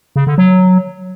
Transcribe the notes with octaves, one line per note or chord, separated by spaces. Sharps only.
C#3
D3
F#3